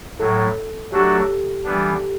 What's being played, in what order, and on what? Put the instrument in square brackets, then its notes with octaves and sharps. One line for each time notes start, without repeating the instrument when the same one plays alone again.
[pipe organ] A2 F#3 A3 [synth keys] A4
[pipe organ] F#3 A3 D4 F#4 A4 [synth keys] G4
[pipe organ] E3 G3 B3 D4